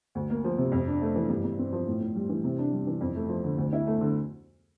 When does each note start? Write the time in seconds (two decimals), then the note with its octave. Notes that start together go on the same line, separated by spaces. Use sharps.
0.15 D2
0.30 A#3
0.44 F3
0.58 C3
0.72 F2
0.87 D4
1.01 A3
1.16 E3
1.29 G2
1.44 G2
1.59 C4
1.73 F3
1.87 A2
2.00 A2
2.16 G3
2.29 E3
2.44 C3
2.59 D4
2.73 G3
2.87 E3
3.01 F2
3.16 A3
3.29 F3
3.44 D3
3.58 D2
3.73 E4
3.87 A3
4.01 D3